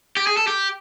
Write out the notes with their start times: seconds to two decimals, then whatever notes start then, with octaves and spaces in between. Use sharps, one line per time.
0.17 G4
0.27 G#4
0.37 A4
0.47 G4